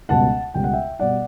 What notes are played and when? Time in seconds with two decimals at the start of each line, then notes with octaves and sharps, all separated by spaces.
0.09 C#2 B2 G3 F#5 A5
0.54 C#2 B2 G3 G5
0.64 F#5
0.73 E5 G5
0.99 B2 G3 D5 F#5